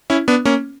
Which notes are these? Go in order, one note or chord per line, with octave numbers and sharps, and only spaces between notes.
C#4 E4
B3 D4
A#3 C#4